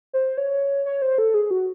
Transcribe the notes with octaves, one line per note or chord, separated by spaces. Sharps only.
C5
C#5
C#5
C5
A4
G#4
F#4